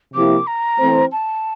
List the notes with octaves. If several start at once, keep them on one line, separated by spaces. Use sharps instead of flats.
C3 F3 A#3 E4 G4 D6
A#5
E3 A3 C4
A5